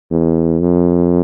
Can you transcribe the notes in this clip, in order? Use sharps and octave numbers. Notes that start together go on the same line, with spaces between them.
E2
F2